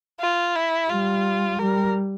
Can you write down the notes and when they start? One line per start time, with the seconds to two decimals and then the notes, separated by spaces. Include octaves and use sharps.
0.21 F4
0.56 E4
0.89 G3 F4
1.59 G3 A#4